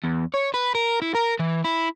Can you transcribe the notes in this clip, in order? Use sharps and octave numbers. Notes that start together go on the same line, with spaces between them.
E2
C#5
B4
A#4
E4
A#4
E3
E4